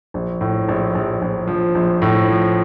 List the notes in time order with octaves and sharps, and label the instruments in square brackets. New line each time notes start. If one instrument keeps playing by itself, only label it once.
[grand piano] A#1
A2
A#1
A#1
A#1
F3
A#1
A2
F3